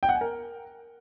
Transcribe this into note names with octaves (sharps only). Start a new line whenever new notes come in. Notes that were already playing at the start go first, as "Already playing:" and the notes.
G5
F#5
G#5
A#4